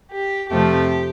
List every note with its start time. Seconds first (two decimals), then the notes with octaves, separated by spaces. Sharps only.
0.12 G4
0.50 F2 C3 F3 A3 G4